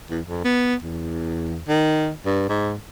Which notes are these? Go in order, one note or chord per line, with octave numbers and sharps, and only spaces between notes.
E2
F2
B3
E2
D#3
G2
G#2